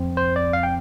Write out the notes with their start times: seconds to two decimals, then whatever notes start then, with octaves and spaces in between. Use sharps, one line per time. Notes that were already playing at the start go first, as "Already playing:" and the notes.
Already playing: F2 F3 C4
0.17 C5
0.36 D5
0.53 F5
0.63 G5